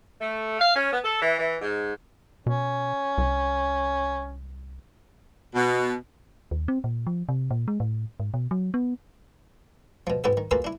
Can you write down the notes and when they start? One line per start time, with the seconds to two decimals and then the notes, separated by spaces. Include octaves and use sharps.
0.20 A3
0.59 F5
0.75 C#4
0.92 B3
1.03 A4
1.20 E3
1.39 E3
1.61 G#2
2.46 B2 C#4
3.18 C2
5.55 B2
6.51 D#2
6.68 C4
6.84 A#2
7.07 F3
7.29 C3
7.51 A#2
7.68 G#3
7.80 A2
8.20 G#2
8.34 B2
8.51 F#3
8.74 B3
10.07 B2 F3
10.24 G#2 B3 F#4 G4 A4
10.37 D#3
10.51 A#3 F4 F#4 G#4 A4 B4
10.64 D4 E4